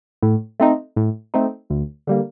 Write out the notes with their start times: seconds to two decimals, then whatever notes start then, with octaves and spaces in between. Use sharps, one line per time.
0.23 A2
0.60 A3 C4 D#4
0.96 A2
1.34 A3 C4 D#4
1.70 D2
2.07 D3 G3 A#3